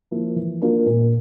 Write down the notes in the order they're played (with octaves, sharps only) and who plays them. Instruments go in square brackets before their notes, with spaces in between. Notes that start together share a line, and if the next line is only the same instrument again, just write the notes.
[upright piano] F3 A#3 E4
E3
A#3 D4 F4 A#4
A#2